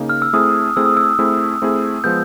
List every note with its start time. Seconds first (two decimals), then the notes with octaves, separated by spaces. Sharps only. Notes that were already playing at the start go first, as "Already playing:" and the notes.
Already playing: C#3 A#3 D#4
0.10 F6
0.22 E6
0.33 A3 C4 E4 G#4 D#6
0.77 A3 C4 E4 G#4 E6
0.86 D#6
0.97 E6
1.19 A3 C4 E4 G#4
1.62 A3 C4 E4 G#4
2.04 F3 G#3 B3 G6